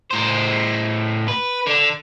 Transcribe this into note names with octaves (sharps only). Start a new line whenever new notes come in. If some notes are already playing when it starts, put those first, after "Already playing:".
A2 C5
B4
D3